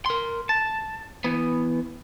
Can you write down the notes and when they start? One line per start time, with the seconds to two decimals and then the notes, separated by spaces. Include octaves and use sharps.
0.06 A#4 C6
0.49 A5
1.24 E3 B3